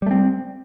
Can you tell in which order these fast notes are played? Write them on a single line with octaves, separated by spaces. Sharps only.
G3 A3 C4